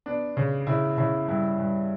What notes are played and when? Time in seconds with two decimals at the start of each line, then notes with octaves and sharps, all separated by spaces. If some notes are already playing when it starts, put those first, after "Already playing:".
0.06 B3 D4
0.37 C#3
0.67 C#3 E4
0.98 C#3 E4
1.28 G2 E4
1.60 G2